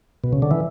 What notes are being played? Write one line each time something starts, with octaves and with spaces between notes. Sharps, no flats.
B2
C#3
D3
E3